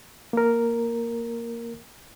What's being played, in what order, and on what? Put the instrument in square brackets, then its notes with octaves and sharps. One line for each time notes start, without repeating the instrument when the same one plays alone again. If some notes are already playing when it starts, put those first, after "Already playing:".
[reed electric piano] A#3 A#4